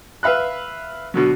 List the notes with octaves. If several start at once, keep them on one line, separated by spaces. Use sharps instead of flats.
B4 E5 F5 B5 F#6
B2 D3 F#3